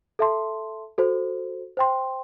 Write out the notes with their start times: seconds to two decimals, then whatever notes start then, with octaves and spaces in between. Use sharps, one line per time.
0.19 A4 E5 A5 C6
0.98 F#4 A4 C5
1.77 C5 G5 C6